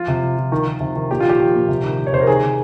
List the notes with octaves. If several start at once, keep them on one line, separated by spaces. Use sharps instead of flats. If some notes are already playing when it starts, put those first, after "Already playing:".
Already playing: F3 F4
C3
F3
F3
D#3
D#3
C3
D#3
A#2 G4
F4
F3 G4
F3
A#2
C3
D#3
D#3
C#5
C3 C5
A#4
D#3 G#4
C3